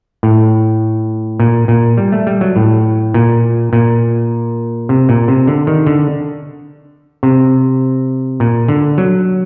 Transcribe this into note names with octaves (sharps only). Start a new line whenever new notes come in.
A2
A#2
A#2
G3
A3
G3
F#3
A2
A#2
A#2
C3
A#2
C3
D3
D#3
D3
C3
A#2
D3
F#3